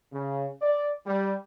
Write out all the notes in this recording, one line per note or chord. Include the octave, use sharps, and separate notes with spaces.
C#3
D5
G3